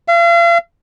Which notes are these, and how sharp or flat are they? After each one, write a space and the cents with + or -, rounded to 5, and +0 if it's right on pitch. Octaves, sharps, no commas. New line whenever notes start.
F5 -40